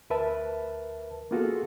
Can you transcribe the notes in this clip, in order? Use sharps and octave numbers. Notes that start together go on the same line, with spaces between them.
D2 A#4 B4 E5 A5
A#3 B3 F4 F#4 G#4 A4